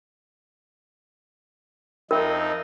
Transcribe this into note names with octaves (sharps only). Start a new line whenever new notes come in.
F2 D#4 A#4 E5 G5 B5